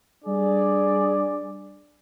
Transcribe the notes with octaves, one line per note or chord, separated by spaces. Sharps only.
G3 D4 G#4 D5